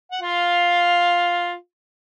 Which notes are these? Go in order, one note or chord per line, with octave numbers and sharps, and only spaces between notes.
F#5
F4 F5